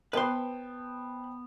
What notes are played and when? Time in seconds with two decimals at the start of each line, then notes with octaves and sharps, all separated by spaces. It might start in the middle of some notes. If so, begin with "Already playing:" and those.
0.13 B3 B4 C5 G5 A5 C6